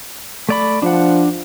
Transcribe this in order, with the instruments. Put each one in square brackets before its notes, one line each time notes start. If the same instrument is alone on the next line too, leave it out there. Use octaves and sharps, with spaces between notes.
[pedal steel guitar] A3 D5 B5
[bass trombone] F3 [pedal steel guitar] D4 F#5